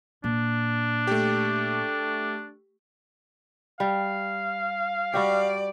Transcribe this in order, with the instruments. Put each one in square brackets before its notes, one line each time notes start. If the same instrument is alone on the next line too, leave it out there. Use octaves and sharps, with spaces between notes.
[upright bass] A#2 [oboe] D4
[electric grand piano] A3 G4
[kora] G3 [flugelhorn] F5
[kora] G3 F#4 G4 [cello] D5